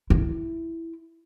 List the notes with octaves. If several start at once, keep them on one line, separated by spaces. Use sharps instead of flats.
E4